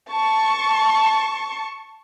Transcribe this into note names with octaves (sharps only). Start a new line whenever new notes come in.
A5 C#6